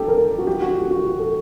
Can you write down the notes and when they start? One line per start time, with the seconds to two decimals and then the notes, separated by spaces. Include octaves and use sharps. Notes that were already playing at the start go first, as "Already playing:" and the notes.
Already playing: G4 A4
0.08 A#4
0.18 A4
0.38 F#4
0.47 G4
0.62 F#4
0.82 G4
0.91 F#4
1.05 G4
1.19 A4